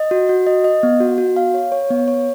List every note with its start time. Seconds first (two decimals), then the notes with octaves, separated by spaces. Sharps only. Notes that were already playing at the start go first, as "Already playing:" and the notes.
Already playing: D#5
0.11 F#4
0.29 F#4
0.47 D#5
0.64 D#5
0.83 B3
1.00 F#4
1.18 F#4
1.36 F5
1.54 C#5
1.72 C#5
1.91 B3
2.08 C#5